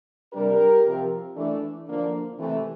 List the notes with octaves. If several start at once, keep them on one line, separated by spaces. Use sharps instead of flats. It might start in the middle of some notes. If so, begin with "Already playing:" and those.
C3 G3 D4 G4 A#4
C3 F3 C4
E3 A3 D4
D3 F3 A#3 D4
C3 E3 A3